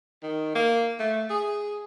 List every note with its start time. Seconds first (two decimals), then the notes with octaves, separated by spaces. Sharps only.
0.23 D#3
0.55 A#3
0.99 A3
1.30 G#4